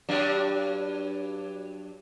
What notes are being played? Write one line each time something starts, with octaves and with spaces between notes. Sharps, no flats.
G2 F#3 D4